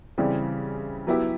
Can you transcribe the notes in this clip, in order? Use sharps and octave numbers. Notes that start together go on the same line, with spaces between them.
C#3 E3 G3 C4
F#3 B3 E4 G4